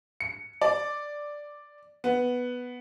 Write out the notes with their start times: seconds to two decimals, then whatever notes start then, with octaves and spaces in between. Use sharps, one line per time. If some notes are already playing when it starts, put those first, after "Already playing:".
0.20 C#7
0.61 D5
2.04 B3